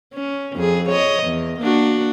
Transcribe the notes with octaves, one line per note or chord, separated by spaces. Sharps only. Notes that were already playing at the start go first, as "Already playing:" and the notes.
C#4
F2 G#4
C#5 D#5
E2
A#3 D4 F#4